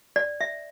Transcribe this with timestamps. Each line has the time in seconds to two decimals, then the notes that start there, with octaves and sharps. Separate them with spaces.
0.16 D5
0.41 E5